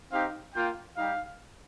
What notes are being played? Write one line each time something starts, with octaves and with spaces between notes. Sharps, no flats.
C4 D#4 G4 F5
A#3 F4 G5
G3 D#4 G4 F5